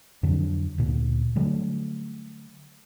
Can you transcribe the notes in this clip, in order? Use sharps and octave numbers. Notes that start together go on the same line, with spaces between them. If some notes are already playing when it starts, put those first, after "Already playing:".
F2 D3 F#3 D4
D2 A#2
D3 F#3 G3 A3